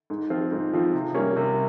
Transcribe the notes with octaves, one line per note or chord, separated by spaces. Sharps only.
G#2
F3 C4 F4
G#2
F3 C4 F4
C3
G3 A#3 C#4
C3